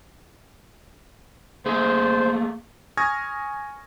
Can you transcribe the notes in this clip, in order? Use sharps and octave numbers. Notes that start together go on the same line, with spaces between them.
A3 A#3 G#4 C5
G#5 C#6 D#6 F6 G#6 A#6